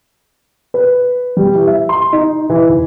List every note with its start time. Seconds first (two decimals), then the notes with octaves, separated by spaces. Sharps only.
0.74 B4
1.37 G3
1.55 E3
1.67 E5
1.89 C6
2.12 D#4
2.50 E3
2.69 D#2